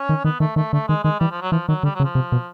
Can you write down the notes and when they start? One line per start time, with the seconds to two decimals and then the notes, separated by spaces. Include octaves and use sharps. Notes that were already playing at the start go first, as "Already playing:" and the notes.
Already playing: C#4
0.09 D#3
0.24 D#3 B3
0.40 D#3 A3
0.56 D#3 A3
0.73 D3 A3
0.88 D#3 G#3
1.04 D#3 G#3
1.20 E3 G3
1.31 F3
1.41 F#3
1.52 E3 F3
1.68 D#3 F#3
1.83 D3 G3
1.95 F#3
2.00 C#3
2.04 F3
2.15 C3
2.32 B2